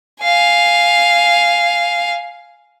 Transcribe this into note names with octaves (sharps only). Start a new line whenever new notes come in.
F5 G#5